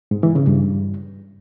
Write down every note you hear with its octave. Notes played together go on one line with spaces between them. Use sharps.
G#2
E3
C#3
G2